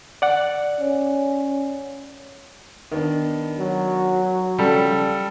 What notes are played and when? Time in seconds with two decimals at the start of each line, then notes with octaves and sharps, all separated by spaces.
0.22 D5 F#5
0.80 C#4
2.92 D#3 B3 D4
3.59 F#3
4.58 C#3 F3 G3 A4